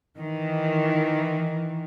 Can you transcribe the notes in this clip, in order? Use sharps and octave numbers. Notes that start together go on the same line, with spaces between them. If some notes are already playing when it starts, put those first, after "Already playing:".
D#3 E3